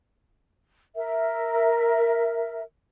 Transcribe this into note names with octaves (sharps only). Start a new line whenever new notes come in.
A#4 E5